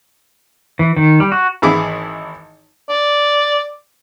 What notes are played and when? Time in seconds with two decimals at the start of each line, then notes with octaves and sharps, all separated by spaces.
0.79 E3
0.97 D#3
1.20 G3
1.32 F#4
1.62 G#1 E3 E4 G#4 D6
2.90 D5